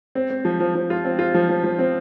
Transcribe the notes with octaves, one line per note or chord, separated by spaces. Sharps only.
C4
C4
F3
F3
F3
F4
C4
F4
F3
F3
F3
C4